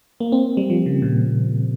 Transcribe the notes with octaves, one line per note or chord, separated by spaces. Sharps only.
A#3
C4
G3
F3
C#3
A#2